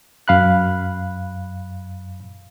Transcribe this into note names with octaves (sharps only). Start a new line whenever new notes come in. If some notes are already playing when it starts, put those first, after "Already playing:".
F#2 F5 B5 F#6